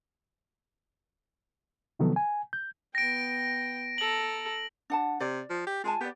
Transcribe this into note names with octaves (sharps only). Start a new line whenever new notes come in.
C3 D#3 F3 F#3 B3 A4
G#5
G6
B3 G5 A#6 D7
A4 A#5 F#7
D4 F#5 A5
C3 D5
F3
G4
G#3 F4 G#5 A5
B3 G4 D5